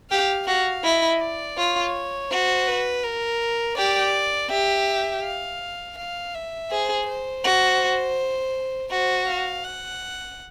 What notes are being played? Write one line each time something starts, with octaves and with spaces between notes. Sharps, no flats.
G4 F5
F#4 F5
E4 D#5
D5
F4 C#5
F#4 C5
B4
A#4
G4 D5
G4 E5
F5
F5
E5
G#4 C5
C5
F#4
F#4 C5
F5
F#5